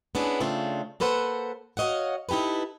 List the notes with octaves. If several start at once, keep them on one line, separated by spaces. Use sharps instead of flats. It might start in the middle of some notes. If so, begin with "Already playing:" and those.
B3 C#4 D4 E4 G#4
C#3 A3 C4 D4 F4
A#3 A4 B4 C5 F#5
F#4 C#5 D#5 F5 F#5
D#4 E4 G4 A4 B4